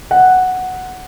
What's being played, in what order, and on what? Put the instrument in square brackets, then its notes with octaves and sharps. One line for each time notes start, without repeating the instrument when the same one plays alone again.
[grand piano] F#5